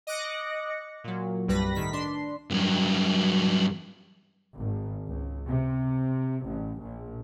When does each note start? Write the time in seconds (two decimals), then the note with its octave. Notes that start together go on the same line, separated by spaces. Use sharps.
0.07 D#5 D6 F#6 A#6 C#7
1.04 A#2 F#3
1.48 C2 G2 G3 B4 B5 A#6
1.75 A2 D#3 B6
1.93 D4 C6
2.51 G2 F#3
4.57 G#1
5.06 C#2
5.48 C3
6.45 A1
6.81 A#1